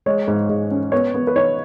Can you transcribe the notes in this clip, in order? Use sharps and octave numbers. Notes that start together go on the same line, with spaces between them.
G#3 C#5
G#2
G#2
C#4
B3 C#5
B3
B4
D#4 C#5